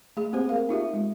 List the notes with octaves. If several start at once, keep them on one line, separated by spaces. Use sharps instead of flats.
A3 G#4
A#3 C4 G4 C5
G#4 A#4 F5
D#4 F4 G4 E5
G#3